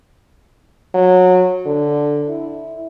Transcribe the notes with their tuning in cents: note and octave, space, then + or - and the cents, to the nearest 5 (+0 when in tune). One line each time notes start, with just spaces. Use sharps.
F#3 -20
D3 +0
E4 -15